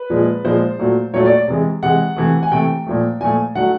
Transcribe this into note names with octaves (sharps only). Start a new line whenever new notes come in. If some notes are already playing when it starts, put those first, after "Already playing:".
Already playing: B4
A#2 F3 G#3
A#2 F3 G#3 C5
A#2 F#3 A3
A#2 F#3 A3 C#5
D5
C3 E3 G#3
C3 E3 G#3 F#5
C3 E3 A3
G#5
C3 E3 A3 G5
A#2 F3 A3
A#2 F3 A3 G#5
D3 F#3 A3 F#5